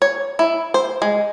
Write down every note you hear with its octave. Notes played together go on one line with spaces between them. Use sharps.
C#5
E4
C5
G#3